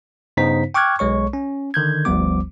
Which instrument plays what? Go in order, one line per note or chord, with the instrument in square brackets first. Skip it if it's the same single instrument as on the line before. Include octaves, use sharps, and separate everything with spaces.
[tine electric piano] G2 C#3 B3 D#4 C5 B6
G5 C#6 D6 F6 F#6 G#6
B1 G#3 C#5 C#6
C#4
D3 D#3 G6 G#6
G1 D2 F3 G3 B3 D6